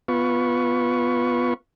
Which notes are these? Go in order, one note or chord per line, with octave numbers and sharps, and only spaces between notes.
B3 F4 B4 C#6